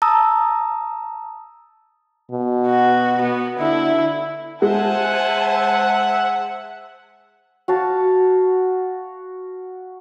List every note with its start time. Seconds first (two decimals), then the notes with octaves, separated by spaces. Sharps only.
0.02 A5 A#5 D#6 E6
2.32 B2
2.68 F#4
3.21 B3
3.59 D3 E4
4.62 G#3 C5 E5 F#5 G#5 A5
7.68 F#4 F5 A5